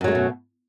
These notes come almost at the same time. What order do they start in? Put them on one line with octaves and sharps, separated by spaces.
F#2 F#3 G#3 A3 B2